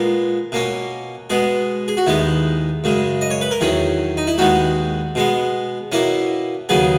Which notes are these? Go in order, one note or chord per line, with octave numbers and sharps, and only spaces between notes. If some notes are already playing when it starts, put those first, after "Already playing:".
Already playing: A#2 G#3 B3 A#4
B2 A#3 C#4
B2 G#3 B3 G#4
G#4
F#4
D#2 D#3 G#3 B3 E4
F#2 C#3 G#3
D#5
C#5
B4
A#4
E2 D#3 F#3 C#4 G#4
D#4
E4
D#2 D#3 G#3 B3 F#4
B2 G#3 B3
B2 A#3 C#4 E4
D#2 C#3 F#3 B3 G#4